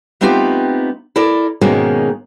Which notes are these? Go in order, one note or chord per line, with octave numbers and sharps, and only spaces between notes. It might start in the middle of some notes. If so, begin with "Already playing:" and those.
A3 B3 C4 D#4 F4 G4
E4 A4 A#4 D5
G#2 B2 D#3 G#3 A#3 C#4